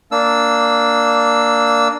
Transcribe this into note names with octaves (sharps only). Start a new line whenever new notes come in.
A#3 D4 E6